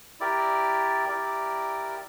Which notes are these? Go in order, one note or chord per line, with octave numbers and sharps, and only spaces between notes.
E4 G4 A#4 D5
E4 G4 A#4 D5